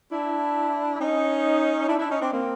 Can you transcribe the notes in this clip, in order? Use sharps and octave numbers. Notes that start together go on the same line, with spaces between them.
D4 E4
E4
C#4 D#4
D4 E4
D4 E4
C#4 D#4
C4 D4
A#3 C4